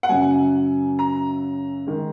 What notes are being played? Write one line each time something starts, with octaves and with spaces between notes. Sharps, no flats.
F#5
F#2 C#3 F#3 G#5
A#5
D#3 G#3